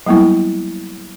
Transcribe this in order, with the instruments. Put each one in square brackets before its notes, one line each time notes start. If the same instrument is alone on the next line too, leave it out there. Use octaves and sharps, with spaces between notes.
[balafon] F#3 G3 A#3 B3 E4